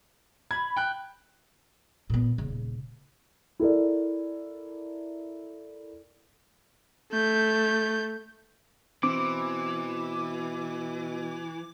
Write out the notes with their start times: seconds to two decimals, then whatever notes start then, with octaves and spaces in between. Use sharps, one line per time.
0.51 B5 G#6
0.77 G5 F#6
2.10 A#2 B3
2.38 D#1 C#3
3.59 E4 A4 A#4 D5
7.12 A3 G6
9.03 B2 E3 C4 D6